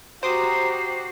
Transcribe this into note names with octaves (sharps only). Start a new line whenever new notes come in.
F#4 G4 C5 A#5 D6 D#6 C7